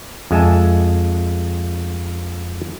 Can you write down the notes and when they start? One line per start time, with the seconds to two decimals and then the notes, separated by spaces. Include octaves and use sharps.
0.31 F2 G#3 E5 G#5 A5